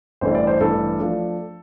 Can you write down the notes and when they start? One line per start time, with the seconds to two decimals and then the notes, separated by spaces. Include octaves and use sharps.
0.21 A1 G2 E3 A3 C5
0.35 D5
0.47 C5
0.60 A1 G2 E3 A3 A4
0.99 F3 A3 D4